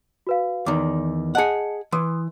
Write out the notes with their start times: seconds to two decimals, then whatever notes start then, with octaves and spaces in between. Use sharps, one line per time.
0.27 F#4 B4 F5
0.66 E2 D#3 D6
1.35 G#4 D#5 F#5 A5 C#7
1.92 E3 C6 D#6